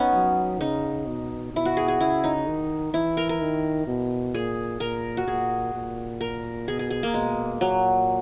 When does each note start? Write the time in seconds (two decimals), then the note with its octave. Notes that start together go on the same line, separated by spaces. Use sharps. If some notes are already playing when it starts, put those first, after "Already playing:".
Already playing: B3 C#4 D#4
0.13 F#3
0.60 C#3 D#4
1.07 B2
1.53 B2 E4
1.65 F#4
1.77 G#4
1.88 G#4
2.00 C#3 E4
2.24 D#4
2.47 D#3
2.93 E3 E4
3.17 A#4
3.29 A#4
3.41 D#3
3.87 B2
4.34 A#2 G#4
4.80 A#2 A#4
5.17 F#4
5.27 A#2 G#4
5.74 A#2
6.21 A#4
6.68 B2 G#4
6.79 G#4
6.91 G#4
7.03 A#3
7.14 B2 G#3
7.61 A#2 F#3